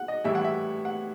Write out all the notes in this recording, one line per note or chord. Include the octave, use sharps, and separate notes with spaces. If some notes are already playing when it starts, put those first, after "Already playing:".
Already playing: F#5
D#5
A2 E3 G3 E5
F#5
E5
F#5